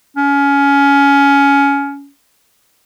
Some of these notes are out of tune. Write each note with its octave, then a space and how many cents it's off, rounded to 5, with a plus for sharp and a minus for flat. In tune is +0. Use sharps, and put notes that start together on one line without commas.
C#4 +20